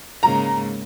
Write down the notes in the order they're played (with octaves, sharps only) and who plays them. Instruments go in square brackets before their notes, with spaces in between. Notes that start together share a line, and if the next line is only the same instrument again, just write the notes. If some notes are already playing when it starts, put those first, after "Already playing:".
[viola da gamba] G#2 C#3 A#3 [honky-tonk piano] A#5